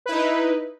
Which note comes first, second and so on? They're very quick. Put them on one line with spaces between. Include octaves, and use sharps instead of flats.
B4 E4 D#4